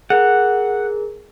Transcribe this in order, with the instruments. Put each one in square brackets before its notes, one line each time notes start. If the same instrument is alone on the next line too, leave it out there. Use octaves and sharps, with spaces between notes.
[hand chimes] G#4 A#4 [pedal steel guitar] F#5